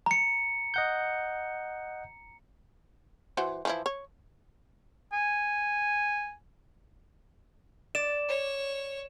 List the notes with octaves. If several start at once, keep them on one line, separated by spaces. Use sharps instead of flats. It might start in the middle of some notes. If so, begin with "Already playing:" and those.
A#5 C#7
D#5 F#5 G6
E3 F#4 C5
E3 F3 E4
C#5
G#5
D5 E7
C#5